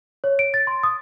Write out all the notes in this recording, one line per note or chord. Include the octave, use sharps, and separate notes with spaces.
C#5
D7
A6
C6
D#6